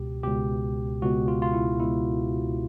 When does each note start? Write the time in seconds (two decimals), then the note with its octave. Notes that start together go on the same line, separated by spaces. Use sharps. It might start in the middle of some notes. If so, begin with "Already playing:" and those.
Already playing: C#2 B2 G4
0.23 C#2 B2 G4
1.02 C#2 B2 F#4
1.28 F4
1.42 F4
1.54 E4
1.80 C#2 B2 E4